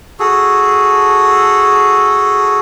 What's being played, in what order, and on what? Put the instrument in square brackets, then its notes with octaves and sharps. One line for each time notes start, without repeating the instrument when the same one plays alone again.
[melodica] F#4 G#4 A4